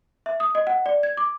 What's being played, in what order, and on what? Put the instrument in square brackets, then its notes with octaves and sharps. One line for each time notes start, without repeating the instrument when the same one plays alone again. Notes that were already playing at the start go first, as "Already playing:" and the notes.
[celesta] E5
D#6
D#5
F#5
D5
G#6
D6